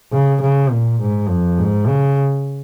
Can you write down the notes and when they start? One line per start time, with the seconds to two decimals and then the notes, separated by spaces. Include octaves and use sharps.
0.12 C#3
0.42 C#3
0.71 A#2
1.00 G#2
1.29 F2
1.58 G#2
1.87 C#3